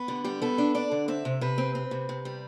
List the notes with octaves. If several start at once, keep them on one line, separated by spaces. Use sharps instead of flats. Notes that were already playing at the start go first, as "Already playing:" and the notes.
Already playing: B3
D3 G4
G3 G4
B3 A4
D4
D4 D5
D3
C4 E5
C3
C3 B4
C4
C4
C3
C3
G3